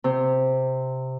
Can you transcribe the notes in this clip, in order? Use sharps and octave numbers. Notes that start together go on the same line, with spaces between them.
C3